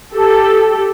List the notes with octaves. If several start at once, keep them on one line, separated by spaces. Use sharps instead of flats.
G4 A4